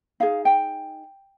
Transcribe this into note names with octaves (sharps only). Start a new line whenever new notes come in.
D#4 G#4 F5
G5